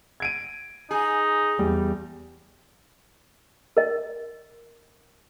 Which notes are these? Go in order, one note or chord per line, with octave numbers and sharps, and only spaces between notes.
G#6 D7 D#7
D#4 G#4
E2 G3
A#4 D#5